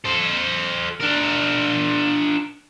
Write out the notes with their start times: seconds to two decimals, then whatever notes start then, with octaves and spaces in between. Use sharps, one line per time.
0.04 A4 C5
1.00 D4 A#4